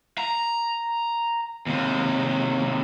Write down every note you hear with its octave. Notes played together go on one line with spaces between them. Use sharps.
A#5
D#2 C3